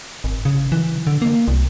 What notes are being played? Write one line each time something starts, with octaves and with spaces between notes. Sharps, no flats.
G#1
C#3
E3
D3
A#3
C2